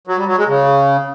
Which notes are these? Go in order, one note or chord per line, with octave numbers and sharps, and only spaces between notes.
F#3
G3
F#3
G#3
C#3